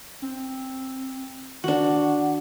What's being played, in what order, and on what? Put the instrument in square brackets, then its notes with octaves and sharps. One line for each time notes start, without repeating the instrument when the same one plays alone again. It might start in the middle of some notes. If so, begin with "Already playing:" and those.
[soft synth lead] C4
[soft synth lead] D#3 [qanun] D4 F#4 [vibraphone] F#5